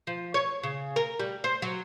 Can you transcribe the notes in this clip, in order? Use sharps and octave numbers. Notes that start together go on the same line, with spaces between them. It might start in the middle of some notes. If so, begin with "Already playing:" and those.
F3
C#5
C#3
A#4
G3
C5
F#3